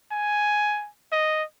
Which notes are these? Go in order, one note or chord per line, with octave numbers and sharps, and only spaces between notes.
G#5
D#5